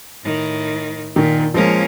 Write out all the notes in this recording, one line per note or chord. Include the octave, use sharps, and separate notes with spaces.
A2 D#3
A#2 D#3
F3 G#3 A#3 C#4